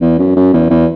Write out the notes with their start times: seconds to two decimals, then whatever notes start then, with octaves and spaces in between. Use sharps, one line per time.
0.01 E2
0.18 F#2
0.36 F#2
0.53 E2
0.70 E2